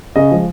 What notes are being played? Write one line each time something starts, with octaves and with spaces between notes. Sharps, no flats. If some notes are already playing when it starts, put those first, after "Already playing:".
C#3 D#5
F3 G#3